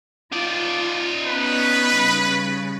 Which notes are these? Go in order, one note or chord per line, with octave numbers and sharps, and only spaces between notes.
D#4 F4 D5
B3 C#4 B4
C#3 G3